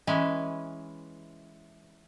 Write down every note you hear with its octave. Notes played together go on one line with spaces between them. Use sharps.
E3 G#3 C#4 B4 G#5